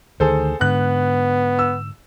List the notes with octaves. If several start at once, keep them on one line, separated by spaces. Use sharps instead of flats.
D2 D#3 G#4 A4 C5
G#2 D3 B3 F#6
E6